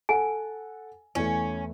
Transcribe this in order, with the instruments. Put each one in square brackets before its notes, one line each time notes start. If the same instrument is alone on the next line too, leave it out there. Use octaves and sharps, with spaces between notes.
[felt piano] A4 F#5 [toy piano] G#5
[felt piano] E2 A3 [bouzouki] C#4